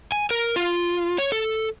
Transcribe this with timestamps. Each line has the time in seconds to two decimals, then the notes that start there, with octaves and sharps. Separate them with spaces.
0.12 G#5
0.31 A#4
0.56 F4
1.18 C#5
1.32 A4